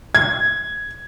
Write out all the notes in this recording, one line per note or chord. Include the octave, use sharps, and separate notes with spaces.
G#6